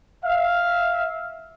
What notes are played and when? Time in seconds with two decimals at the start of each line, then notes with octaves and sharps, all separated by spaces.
0.25 E5 F5